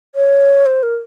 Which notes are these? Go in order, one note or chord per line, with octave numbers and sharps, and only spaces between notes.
C#5
C5
A#4